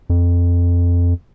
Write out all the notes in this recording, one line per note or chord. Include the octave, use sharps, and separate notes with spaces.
F2